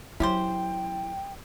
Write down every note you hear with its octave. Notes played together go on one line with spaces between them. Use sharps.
F#3 C#4 E4 G4 C5 G5